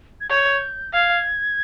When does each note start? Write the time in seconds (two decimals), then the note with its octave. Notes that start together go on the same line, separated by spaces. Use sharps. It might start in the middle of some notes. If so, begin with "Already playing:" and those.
0.21 G#6
0.30 C#5 G6
0.93 F5 G#6